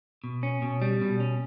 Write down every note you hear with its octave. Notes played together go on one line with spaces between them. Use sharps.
B2
C#4
B2
G3
B2
C#4